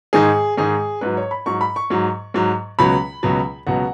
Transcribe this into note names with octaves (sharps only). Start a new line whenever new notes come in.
G#2 D#3 G#3 G#4
G#2 D#3 G#3 G#4
G#2 F#3 B4
C#5
B5
G#2 F#3 C#6
B5
C#6
G#2 F#3
G#2 F#3
C#2 B2 F#3 B5
C#2 B2 F#3
C#2 B2 F#3 F#5